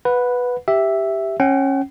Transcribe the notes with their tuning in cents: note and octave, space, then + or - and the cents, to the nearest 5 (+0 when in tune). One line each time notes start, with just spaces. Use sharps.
B4 +0 F#5 -25
G4 +0 E5 +0
C#4 -20 F#5 +45